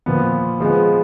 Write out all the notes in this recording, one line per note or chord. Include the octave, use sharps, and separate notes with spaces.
A#2 F3 B3
F3 G#3 B3